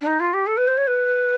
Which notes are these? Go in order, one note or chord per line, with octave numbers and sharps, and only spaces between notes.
D4
D#4
F4
G4
A4
B4
C5
C#5
B4